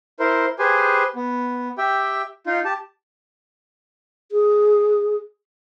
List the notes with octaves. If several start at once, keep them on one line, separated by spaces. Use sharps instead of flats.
E4 A#4 C5
G4 G#4 B4 C5 G#5
B3
G4 E5 G5
D#4 F4
G4 A5
G#4